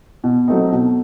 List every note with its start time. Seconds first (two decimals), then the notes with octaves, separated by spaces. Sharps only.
0.24 B2
0.48 F#3 A3 C4 D#4
0.72 B2